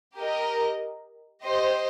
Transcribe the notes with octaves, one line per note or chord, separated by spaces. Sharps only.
G4 A#4 D#5
G4 C5 D#5